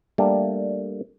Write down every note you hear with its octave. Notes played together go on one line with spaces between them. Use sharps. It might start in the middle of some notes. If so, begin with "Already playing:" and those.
G3 A3 A#3 D4